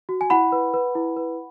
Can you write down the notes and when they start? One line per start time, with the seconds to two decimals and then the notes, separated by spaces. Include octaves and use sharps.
0.09 F#4
0.21 G#5
0.30 E4 F#5 B5
0.52 B4
0.74 B4
0.95 E4
1.16 B4